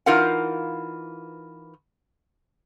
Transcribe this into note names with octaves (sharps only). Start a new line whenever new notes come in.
E3 D#4 F4 A#4 F5 F#5